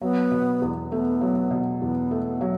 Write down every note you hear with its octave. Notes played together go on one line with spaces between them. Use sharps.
F#3 B3
B2
E2
A3 B3
F#3
B2
E2 B3
A3
F#3